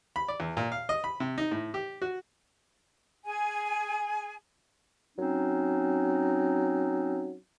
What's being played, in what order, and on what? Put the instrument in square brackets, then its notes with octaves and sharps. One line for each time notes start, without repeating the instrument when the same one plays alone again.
[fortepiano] B5
D5
E2
A#2
F5
D#5
B5
C3
D#4
A2
G4
F#4
[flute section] G#4 G#5
[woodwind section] F#3 C4 C#4 D#4